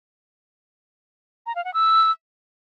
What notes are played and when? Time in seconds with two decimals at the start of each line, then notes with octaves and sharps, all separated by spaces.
1.46 A#5
1.56 F5
1.65 F#5
1.74 E6